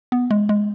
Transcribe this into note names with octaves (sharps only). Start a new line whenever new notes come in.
B3
G#3
G#3